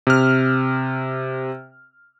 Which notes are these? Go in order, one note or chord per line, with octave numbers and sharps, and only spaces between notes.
C3 F6